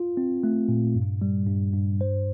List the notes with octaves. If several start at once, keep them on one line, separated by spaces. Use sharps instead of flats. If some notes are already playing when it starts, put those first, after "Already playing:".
Already playing: F4
C4
A3
A#2
G2
G3
G2
G2
C5